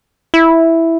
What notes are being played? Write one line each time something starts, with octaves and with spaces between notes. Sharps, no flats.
E4